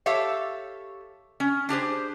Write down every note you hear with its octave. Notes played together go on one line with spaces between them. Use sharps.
G4 A4 C#5 E5 F5
C#4
D4 G4 G#4 C5